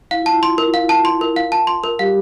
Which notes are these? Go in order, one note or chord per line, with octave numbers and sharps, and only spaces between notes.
E4 F5
F4 A5
E4
F4 C6
E4 A#4
F4
E4 F5
F4 A5
E4
C6
F4
E4 A#4
F4 F5
A5
C6
A#4
G3 G4 F5